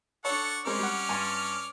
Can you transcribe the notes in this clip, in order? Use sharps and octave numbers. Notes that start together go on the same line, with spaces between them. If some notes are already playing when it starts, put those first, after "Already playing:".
D4 A4 C#5 F#5 C#6
G#3 C4 C#4 A#4 D5 F6
G3 F#5
G2 G#5 C6